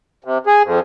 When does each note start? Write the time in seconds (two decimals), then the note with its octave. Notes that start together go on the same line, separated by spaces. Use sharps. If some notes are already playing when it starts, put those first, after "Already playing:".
0.24 C3
0.47 G#4
0.64 F2